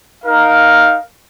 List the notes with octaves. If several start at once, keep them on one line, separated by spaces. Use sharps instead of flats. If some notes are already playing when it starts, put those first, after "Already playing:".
D#4 A#4 F5